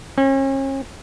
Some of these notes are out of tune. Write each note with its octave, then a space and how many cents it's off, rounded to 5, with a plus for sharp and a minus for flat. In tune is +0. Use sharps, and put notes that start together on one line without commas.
C#4 -40